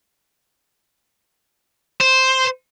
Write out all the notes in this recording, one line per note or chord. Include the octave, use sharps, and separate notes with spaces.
C5